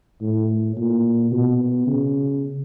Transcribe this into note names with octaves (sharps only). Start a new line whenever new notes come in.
A2
A#2
B2
C#3